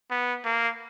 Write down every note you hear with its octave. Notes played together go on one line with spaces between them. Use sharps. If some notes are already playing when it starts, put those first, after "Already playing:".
B3
A#3